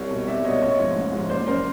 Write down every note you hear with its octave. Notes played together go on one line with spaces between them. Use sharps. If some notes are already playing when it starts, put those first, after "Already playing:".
Already playing: C2 C#5
B2
C2 D5 E5
B2 C#5 D#5
A1 C#5 D#5
G#2 F3
A1
G#2 F3
F#1 C5 D5
F#2 C#3 A#4 C5